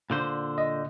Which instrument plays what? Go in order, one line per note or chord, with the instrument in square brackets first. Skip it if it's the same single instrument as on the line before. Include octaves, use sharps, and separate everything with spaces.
[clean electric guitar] A#2 D3 C5
[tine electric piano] D#5